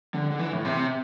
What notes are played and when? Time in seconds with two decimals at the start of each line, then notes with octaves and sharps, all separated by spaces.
0.15 D3
0.31 D3
0.39 E3
0.53 A2
0.65 C3